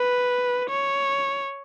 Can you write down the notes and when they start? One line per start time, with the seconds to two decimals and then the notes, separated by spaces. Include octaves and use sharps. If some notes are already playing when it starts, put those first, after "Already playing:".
Already playing: B4
0.70 C#5